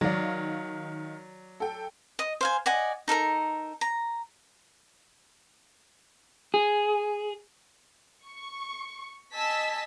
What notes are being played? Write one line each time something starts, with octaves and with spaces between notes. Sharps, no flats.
D#3 F#3 D5 F5
A4 G5
D#5
C5 F5 G#5
D5 D#5 F#5 G#5
D#4 A4 A#4 A#5
A#5
G#4
C#6
D#5 G#5 A5 E6 B6